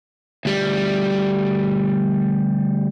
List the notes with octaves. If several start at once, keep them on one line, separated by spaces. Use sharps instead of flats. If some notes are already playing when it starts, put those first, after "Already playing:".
D2 G3